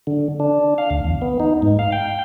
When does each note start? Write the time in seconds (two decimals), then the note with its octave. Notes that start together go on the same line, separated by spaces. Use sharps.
0.07 D3
0.40 D4
0.78 F5
0.91 D2
1.04 E2
1.22 B3
1.40 D#4
1.62 G#2
1.79 F5
1.92 G5